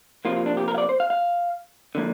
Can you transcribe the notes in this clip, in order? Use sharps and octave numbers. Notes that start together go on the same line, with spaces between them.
C3 F3 A#3 F4
F4
D4
G4
A#4
F5
D5
C5
F5
F5
D3 F3 A#3